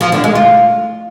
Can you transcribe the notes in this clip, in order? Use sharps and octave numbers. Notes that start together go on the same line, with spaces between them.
F3
D3
G#3
F4